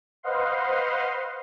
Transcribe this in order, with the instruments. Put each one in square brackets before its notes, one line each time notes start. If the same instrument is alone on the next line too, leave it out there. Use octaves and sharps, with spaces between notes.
[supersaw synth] B4 C5 D#5 F5 F#5 C6